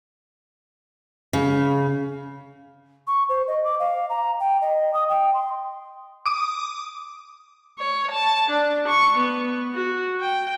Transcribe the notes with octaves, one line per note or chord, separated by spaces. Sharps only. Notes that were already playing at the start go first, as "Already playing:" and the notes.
C#3
C#6
C5
D#5
D6
F5
A#5
G5
D#5
D#6
G5
C6
D6 D#6
C#5
A5
D4
C#6
B3
F#4
G5